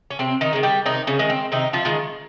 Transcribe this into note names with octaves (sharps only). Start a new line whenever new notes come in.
C#4
C3 C4
D#3 D#4
D#3 G#3
G3 G4
C3 D#3 D#4
C#3 C#4
D#3 G#3
C4
C3 D#3 D#4
F3 F4
D#3 G#3